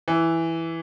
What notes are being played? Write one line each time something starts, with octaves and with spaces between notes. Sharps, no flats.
E3